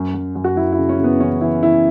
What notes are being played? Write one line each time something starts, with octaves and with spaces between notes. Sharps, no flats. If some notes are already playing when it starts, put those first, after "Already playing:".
Already playing: F#2
F#2
F#2
F#4
F#2 E4
E4
C#3
C#4
C#3 B3
E3 C#4
E3 E4
E3 E4